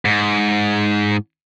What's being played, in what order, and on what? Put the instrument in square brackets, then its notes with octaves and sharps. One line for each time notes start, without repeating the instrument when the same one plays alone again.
[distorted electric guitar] G#2